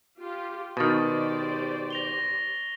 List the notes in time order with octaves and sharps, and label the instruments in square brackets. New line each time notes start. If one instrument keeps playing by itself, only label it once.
[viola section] F4 G4
[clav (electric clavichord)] B2 D#3 [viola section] G4 C5 D5 [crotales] C#6 A6
[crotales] A#6 F7 G7